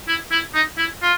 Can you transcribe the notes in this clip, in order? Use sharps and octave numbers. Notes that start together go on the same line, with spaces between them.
E4
E4
D#4
E4
F4